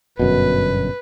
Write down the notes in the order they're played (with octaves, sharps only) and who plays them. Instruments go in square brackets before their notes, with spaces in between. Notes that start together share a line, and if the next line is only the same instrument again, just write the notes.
[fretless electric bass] G1 F#2 B2 [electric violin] B4